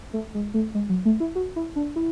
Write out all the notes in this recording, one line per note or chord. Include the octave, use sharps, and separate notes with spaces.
A3
G#3
A3
G#3
F#3
A3
E4
F#4
E4
D4
E4